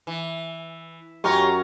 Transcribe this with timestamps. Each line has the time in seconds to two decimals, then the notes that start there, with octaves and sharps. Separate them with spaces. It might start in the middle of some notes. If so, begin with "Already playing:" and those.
0.07 E3
1.24 F#2 C#4 F4 G4 C#5 A#5 C#6